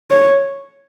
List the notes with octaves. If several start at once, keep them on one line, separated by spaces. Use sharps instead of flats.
C#5